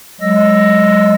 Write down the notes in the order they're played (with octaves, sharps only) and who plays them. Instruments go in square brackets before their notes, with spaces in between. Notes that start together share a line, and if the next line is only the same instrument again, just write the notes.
[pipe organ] F#3 G#3 D#5 E6 A#6